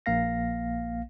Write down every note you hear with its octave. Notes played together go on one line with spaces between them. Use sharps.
A#1 A#3 F5 A#6